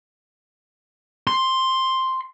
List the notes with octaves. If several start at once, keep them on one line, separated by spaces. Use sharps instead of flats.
C6